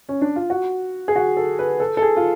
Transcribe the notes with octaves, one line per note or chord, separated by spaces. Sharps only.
C#4
D4
F4
F#4
G#4
F#4
A4
B4
A4
A4
G#4
F4